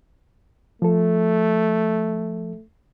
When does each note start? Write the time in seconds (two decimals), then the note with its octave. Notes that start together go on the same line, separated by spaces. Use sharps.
0.82 F3 A3 A4